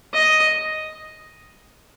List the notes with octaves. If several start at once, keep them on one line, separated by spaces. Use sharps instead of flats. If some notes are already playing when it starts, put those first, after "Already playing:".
D#5